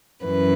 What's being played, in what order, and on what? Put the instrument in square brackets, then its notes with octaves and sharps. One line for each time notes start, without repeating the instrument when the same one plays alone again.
[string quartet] F#2 E3 B4